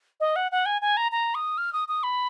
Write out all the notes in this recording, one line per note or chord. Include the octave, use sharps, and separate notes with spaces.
D#5
F#5
F#5
G#5
G#5
A#5
A#5
D#6
F6
D#6
D#6
B5